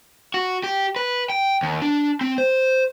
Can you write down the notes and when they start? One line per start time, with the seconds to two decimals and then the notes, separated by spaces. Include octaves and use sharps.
0.34 F#4
0.64 G4
0.96 B4
1.30 G5
1.63 D#2
1.82 D4
2.21 C4
2.38 C5